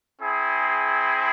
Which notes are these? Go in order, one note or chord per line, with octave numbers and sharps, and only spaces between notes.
C4 E4 G#4